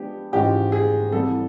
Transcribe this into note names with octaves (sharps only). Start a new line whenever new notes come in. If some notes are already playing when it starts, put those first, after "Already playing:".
Already playing: F3 G#3 B3 D4 G4
G#2 E3 G#3 C#4 F4 G4
G#4
C2 C3 E3 G3 A4